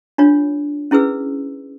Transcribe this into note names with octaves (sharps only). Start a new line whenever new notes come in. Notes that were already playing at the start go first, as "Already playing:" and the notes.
D4 F4 C#5
C#4 E4 G#4 B4 E6